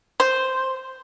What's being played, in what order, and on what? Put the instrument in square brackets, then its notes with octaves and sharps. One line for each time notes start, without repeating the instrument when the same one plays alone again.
[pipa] C5